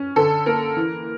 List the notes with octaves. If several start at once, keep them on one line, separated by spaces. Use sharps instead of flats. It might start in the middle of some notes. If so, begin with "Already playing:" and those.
Already playing: C#4
D3 A4
A#3 A#4
E3